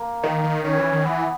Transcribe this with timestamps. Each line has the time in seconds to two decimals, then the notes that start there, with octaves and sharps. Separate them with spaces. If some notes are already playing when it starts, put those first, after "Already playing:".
Already playing: A#3
0.23 D#3
0.44 D#3
0.64 D#3 C#4
0.78 E3
0.92 D#3
1.05 E3 B3